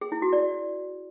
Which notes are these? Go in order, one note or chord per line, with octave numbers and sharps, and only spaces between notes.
G#4
E4
F#4
D5